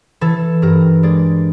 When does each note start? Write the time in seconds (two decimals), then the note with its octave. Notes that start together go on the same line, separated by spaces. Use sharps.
0.21 E3 A4
0.62 G2 A#4
1.03 G#3 D5